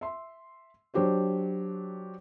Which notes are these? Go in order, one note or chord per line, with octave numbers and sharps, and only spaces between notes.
E5 C6
F#3 D4 G4 C5 C#5